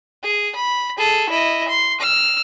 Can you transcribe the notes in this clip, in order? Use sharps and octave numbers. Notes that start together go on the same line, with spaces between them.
G#4
B5
G#4 A4
E4 D#5
C6
E6 F6